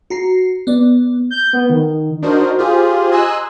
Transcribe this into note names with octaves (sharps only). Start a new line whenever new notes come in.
F#4 A#5 C7
B3 D5
G6
B3
D#3
D4 D#4 F#4 A#4 C5
F4 G4 G#4 C5
D#5 G#5 A#5 C6 E6 F#6